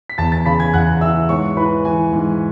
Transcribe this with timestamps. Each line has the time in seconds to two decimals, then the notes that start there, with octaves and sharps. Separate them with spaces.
0.10 B6
0.18 E2 A5 A6
0.32 A5 A6
0.45 C#3 B5 B6
0.59 G#5 G#6
0.73 E2 F#5 F#6
1.01 E3 E5 E6
1.29 G#2 C#5 C#6
1.57 E3 B4 B5
1.85 E3 G#5
2.12 G#2